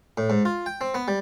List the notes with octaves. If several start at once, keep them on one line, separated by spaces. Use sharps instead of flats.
A2
G#2
F4
G5
C4
B3
G3